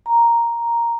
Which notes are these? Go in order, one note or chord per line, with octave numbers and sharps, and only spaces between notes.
A#5